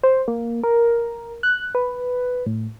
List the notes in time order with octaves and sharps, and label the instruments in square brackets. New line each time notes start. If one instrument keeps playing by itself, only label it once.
[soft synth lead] C5
A#3
A#4
F#6
B4
A2